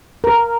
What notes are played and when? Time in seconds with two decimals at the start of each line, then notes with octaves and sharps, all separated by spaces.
0.24 A#4